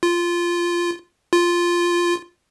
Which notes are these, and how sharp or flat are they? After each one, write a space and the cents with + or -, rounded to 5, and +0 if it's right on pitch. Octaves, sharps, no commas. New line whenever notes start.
F4 -10
F4 -5